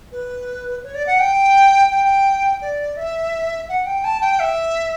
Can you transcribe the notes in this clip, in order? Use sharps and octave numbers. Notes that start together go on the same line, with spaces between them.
B4
C#5
D5
F#5
G5
G5
D5
E5
F#5
G5
A5
G5
E5